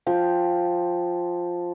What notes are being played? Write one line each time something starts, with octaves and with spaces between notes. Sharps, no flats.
F3 G5